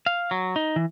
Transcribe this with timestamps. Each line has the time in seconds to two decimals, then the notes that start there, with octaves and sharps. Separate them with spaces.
0.06 F5
0.31 F#3
0.56 D#4
0.76 E3